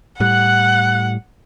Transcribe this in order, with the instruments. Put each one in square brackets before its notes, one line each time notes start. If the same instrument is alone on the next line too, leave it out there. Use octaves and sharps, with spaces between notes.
[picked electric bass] A2 G3 [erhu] F#5 [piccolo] F#6